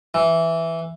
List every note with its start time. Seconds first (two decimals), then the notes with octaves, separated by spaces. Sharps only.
0.14 E3